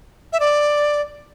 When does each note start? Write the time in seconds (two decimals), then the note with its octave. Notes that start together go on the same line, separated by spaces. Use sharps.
0.33 E5
0.40 D5